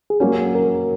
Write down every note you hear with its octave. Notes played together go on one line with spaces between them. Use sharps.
G#4
F#3 A#3 C#4 F#4
A#4